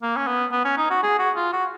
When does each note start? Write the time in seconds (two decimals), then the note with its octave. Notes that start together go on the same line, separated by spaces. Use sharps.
0.02 A#3
0.16 C#4
0.27 B3
0.52 B3
0.65 C#4
0.77 D#4
0.90 F#4
1.03 G#4
1.19 F#4
1.36 F4
1.53 F#4